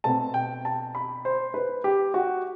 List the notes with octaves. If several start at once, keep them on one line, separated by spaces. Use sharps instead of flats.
B2 A3 C4 A5
G5
A5
B5
C5
B4
G4
F#4